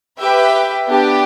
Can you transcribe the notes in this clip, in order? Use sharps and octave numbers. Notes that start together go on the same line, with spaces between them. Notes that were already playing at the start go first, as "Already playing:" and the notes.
G4 B4 E5 G5
B3 D4 G4